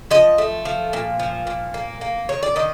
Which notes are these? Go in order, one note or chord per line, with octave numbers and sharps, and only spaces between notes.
F3 D#5
A3
F3
A#2
F3
A#2
A#3
A#3
D#3 C#5
D5
D#3 D#5